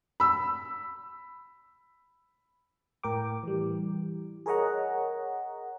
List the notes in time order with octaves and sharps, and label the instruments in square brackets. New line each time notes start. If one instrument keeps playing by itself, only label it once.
[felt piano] B5 E6
[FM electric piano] A2 A#4 G5 D6
E3 G3
G#4 A#4 C#5 D#5 F#5 A#5